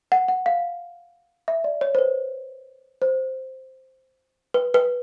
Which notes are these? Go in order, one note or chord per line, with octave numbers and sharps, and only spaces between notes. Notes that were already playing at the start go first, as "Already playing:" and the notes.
F#5
F#5
F5
E5
D5
C#5
C5
B4
C5
B4
B4